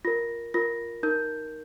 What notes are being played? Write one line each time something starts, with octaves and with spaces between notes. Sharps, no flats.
F4 A#4 A#6
F4 A#4 A#6
D#4 A#4 G6